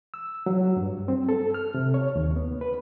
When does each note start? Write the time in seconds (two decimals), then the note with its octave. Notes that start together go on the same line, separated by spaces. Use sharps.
0.14 E6
0.46 F#3
0.77 G2
1.08 C4
1.29 A4
1.54 F6
1.74 C3
1.94 C#5
2.16 D#2
2.36 B3
2.61 B4